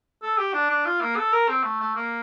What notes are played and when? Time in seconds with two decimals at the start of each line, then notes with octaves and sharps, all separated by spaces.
0.23 A4
0.38 G4
0.54 D4
0.70 D4
0.85 F4
1.01 A#3
1.17 A4
1.32 A#4
1.48 C4
1.63 A3
1.80 A3
1.95 A#3